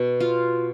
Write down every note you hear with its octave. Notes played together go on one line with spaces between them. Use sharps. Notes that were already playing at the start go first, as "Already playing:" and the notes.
Already playing: B2
F4